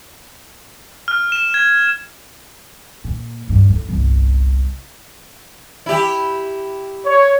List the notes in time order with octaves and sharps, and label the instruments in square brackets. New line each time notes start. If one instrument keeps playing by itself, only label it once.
[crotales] F6
E7
G#6
[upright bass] A#2
D2 G2
A2
G1 C2
[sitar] E4 G4
[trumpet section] C#5